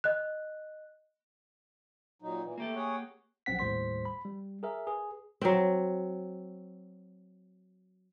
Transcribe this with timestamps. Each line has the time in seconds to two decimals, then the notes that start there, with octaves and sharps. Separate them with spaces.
0.04 D#5 F#6
2.22 A#2 F#3 D#4
2.43 A#2 E3
2.58 A3 A#3 G4 A4
2.76 G#4 C#5 F#5
3.46 A#1 F#3 C4 F#5 B6
3.59 D#2 A2 G3 C5 C6 B6
4.05 B5
4.25 G3
4.63 G#4 A#4 E5
4.87 G#4 B4
5.41 F#3 C4